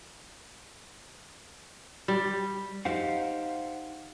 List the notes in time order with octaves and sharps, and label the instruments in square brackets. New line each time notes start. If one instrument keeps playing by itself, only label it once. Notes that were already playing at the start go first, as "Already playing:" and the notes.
[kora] G3
[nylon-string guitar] D#4 G4 [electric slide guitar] C5 F5 F#5